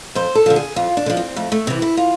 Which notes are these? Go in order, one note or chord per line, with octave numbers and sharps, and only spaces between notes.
F2 C5
A4
D3 F3
G#4
F2 F4
D4
D3
F3
C4
F2 A3
A3
C3 E3 C4
E4
F4